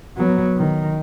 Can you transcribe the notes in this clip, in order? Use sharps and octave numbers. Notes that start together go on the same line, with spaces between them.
F#3 B3
D#3